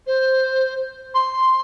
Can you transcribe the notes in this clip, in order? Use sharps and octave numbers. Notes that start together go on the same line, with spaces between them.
C5
C6